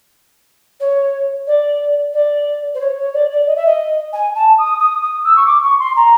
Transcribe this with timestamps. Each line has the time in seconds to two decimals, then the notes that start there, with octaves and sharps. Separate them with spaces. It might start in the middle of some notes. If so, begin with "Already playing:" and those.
0.80 C#5
1.47 D5
2.14 D5
2.75 C5
2.80 C#5
2.97 C#5
3.14 D5
3.30 D5
3.47 D#5
3.56 E5
3.66 D#5
4.13 G#5
4.35 A5
4.58 D#6
4.79 D#6
5.02 D#6
5.24 E6
5.36 C#6
5.46 D6
5.63 C#6
5.79 C6
5.96 A#5